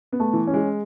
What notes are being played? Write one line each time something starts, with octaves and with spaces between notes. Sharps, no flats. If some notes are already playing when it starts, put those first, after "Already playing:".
B3
A3
E3
C#4
G#3